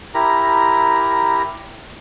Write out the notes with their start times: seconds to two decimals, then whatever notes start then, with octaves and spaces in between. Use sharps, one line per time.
0.14 E4 G4 A#4 A#5